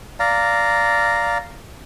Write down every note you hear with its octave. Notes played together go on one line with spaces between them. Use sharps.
D5 F5 A#5